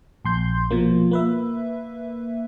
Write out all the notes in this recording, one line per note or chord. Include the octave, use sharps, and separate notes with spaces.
A#1 C6 G6
B2 F3 A#3
A#3 B4 E5